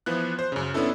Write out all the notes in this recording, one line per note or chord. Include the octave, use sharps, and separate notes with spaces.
E3 F3 B3 F#6
C5
F#2 C#3
B3 C#4 D4 E4 A4